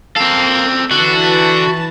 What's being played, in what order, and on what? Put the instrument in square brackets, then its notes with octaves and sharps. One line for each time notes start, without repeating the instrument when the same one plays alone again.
[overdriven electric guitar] C4 A4 [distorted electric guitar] A#4 F5
[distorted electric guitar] D3 [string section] E3 A5 [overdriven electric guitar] F#4